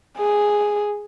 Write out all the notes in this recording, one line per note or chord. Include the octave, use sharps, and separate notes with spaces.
G#4